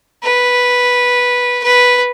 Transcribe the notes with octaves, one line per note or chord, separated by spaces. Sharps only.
B4
B4